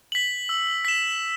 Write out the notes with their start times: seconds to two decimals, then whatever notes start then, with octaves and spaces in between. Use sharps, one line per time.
0.12 B6 F#7
0.49 E6
0.85 B6 E7